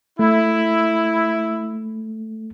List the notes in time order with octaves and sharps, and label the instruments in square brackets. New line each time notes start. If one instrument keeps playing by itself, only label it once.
[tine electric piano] A3 [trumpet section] E4